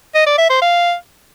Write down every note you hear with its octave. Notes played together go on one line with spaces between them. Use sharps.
D#5
D5
E5
C5
F5